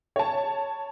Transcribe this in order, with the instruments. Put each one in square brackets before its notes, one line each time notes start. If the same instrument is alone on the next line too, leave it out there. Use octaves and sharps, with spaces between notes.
[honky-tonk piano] C#5 A5